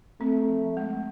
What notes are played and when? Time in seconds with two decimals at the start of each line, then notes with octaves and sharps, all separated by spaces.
0.20 A3 C4
0.48 F3
0.77 G#3